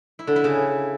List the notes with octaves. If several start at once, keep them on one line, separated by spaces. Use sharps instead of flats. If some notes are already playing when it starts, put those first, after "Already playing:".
E4
D3
E4
C#3